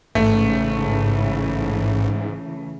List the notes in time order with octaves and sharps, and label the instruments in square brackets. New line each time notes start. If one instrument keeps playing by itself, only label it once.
[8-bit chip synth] A1 [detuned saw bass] G#2 [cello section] C#3 E3 [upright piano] A3